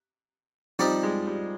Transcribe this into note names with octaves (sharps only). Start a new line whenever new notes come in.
F3 G3 C4 D#4 G4 D5
G#3
G3